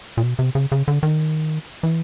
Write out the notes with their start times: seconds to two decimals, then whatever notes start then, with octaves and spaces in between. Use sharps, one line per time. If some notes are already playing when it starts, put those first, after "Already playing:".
0.17 A#2
0.23 B2
0.39 C3
0.55 C#3
0.72 C#3
0.88 D3
1.03 D#3
1.83 E3